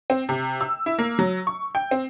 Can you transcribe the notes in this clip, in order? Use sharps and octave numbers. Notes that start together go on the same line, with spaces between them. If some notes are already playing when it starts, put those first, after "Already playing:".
C4
C3
E6
E4
A#3
F#3
C#6
G5
C4